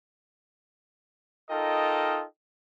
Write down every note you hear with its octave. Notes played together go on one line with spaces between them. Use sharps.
D#4 F4 A4 A#4 D#5 G5